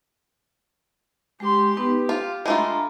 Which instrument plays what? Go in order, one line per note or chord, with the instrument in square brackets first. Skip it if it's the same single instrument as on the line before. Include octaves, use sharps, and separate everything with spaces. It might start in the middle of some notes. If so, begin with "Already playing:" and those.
[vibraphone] G#3 [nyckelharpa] G4 C6
[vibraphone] B3 D#4 B4 [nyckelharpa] G4
[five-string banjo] F4 [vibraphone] F5
[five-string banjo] G#3 A3 F4 [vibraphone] D4 A#5 B5